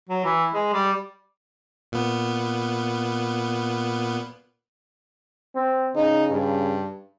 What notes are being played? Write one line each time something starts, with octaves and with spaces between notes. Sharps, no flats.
F#3
E3
G#3
G3
A#2 B3
C4
C#3 D#4
G2